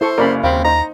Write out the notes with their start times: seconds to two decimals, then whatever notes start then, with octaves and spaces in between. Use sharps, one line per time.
0.01 E4 A4 C5 C#6
0.18 F#1 C#3 A#4 D5 B5
0.44 D#2 C4 F5 B5
0.64 D#4 C5 A#5